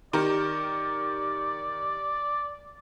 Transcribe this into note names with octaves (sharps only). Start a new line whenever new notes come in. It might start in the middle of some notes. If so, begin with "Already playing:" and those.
D#3 G4 A#4 D5